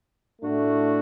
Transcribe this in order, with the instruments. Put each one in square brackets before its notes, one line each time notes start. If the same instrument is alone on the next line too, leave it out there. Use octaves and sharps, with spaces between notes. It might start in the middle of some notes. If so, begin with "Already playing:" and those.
[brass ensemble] A2 A3 D4 F#4